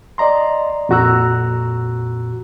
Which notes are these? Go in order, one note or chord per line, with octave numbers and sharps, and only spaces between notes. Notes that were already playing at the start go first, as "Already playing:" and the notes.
D5 D#5 A#5 C6
F2 A#2 F#4 A#5 E6 F#6